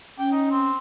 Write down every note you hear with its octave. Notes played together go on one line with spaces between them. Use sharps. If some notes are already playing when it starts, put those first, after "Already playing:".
C#4 G5
D#4
C4